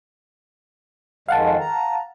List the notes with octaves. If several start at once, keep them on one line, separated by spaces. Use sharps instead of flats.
F2 D#3 G#3 F5 F#5 A5
A#5